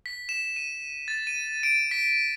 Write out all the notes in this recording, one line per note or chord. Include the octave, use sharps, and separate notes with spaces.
B6
E7
D#7
A6
D#7
D7
B6